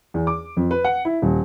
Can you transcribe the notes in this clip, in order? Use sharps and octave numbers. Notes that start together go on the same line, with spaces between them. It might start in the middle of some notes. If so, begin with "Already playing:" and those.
E2
D6
F2
B4
F#5
E4
D#1